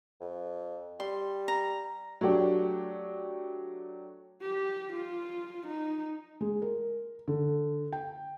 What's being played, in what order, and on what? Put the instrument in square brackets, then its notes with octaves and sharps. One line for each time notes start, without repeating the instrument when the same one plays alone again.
[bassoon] F2
[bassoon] G3 [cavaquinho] C6
[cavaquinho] A#5
[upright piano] F#3 A3 D4 G4
[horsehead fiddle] G4
F4
D#4
[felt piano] G#3
A#4
D3
G5